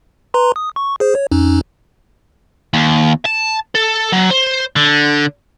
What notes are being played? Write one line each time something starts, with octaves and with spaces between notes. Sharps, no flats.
B4 A#5 C6
D#6
C#6
G#4 C5
C#5
F2 C#4 D#4
D#2
A5
A4
F#3
C5
D3